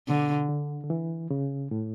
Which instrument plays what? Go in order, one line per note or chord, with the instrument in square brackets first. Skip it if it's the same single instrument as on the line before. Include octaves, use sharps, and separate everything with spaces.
[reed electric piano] B2 [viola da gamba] D3
[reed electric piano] D3
D3
E3
C#3
A2